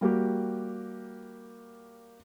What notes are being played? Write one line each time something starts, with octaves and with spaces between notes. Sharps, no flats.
G3 A#3 F#4 G4